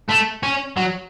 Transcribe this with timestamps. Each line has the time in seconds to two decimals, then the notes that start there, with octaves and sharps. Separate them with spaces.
0.09 A3
0.43 C#4
0.77 F#3